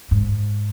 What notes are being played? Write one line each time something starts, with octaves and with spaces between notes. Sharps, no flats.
G#2